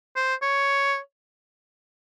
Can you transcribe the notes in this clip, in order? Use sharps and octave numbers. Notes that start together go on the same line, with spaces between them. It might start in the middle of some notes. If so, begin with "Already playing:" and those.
C5
C#5